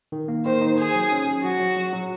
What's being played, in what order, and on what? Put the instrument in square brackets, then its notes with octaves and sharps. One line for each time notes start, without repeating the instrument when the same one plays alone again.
[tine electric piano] D#3
A#3
[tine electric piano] D#3 [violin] C5
[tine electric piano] D#4
[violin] G#4 [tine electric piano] C5
[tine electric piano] F#3
C#4
G#4
[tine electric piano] F#3 [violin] F#4
[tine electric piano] F#3
F#3
F#3